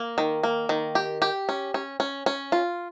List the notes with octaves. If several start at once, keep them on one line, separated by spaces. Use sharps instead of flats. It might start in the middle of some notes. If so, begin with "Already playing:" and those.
Already playing: A#3
D#3
A#3
D#3
G4
G4
C#4
C#4
C#4
C#4
F4